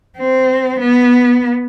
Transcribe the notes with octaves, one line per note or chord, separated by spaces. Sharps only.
C4
B3